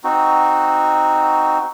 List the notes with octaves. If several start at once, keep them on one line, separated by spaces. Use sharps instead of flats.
C4 D#4 F#4